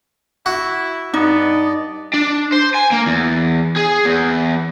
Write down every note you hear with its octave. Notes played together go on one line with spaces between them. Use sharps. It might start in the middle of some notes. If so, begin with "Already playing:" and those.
E4 F#4
G2 B3 D#4 D5 D#5
D4
C5
G#5
A#3
E2
G#4
E2